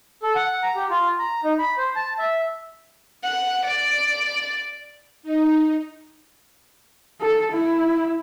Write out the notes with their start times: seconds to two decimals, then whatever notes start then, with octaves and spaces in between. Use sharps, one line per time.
0.23 A4
0.36 F#5
0.63 A#5
0.76 G4
0.90 F4
1.19 A#5
1.44 D#4
1.59 B5
1.77 C5
1.96 A5
2.19 E5
3.23 F#5
3.66 D5
5.23 D#4
7.21 A4
7.52 E4